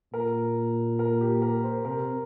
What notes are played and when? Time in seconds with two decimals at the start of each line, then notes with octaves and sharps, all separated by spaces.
0.13 A#2 A#4
0.99 A#4
1.21 G4
1.42 A#4
1.64 C5
1.85 C3 A#4